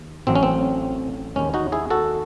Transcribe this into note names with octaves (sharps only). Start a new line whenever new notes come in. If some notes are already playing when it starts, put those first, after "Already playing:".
Already playing: D#2
A1 A2 F#3 A3 C4
C#4
C4
D#2 D#3 G#3 C#4
D#4 F#4
E4 G#4
F#4 A4